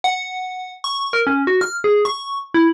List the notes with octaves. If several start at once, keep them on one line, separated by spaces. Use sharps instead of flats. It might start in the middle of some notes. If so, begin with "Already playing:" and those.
F#5
C#6
A#4
C#4
F#4
F6
G#4
C#6
E4